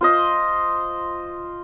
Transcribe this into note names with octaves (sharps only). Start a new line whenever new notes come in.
F4 C5 D#5